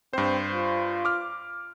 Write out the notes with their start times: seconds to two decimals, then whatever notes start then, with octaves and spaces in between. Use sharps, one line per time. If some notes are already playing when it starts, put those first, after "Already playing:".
0.13 G2 C4 C5
0.53 F4
1.05 D6 F6